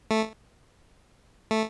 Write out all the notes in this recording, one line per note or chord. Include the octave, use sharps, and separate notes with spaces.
A3
A3